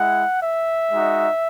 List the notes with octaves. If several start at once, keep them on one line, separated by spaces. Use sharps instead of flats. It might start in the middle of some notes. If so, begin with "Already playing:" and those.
Already playing: G#3 E4 F#5
E5
G#3 D#4 F#4